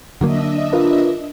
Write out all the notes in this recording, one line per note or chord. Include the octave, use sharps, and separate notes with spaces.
D3 F#3 A#3 D4 D#5 E5
F4 A#4 B4